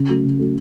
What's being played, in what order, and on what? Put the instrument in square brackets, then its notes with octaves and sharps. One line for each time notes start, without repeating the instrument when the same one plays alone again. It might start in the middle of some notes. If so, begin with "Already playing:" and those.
Already playing: [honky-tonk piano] C#3
F#3 A3
C#3
F#3 A3